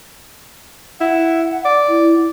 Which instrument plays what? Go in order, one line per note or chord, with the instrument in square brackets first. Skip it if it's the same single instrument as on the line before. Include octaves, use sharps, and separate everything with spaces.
[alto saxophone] E4 [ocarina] F#5
[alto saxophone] D5
[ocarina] E4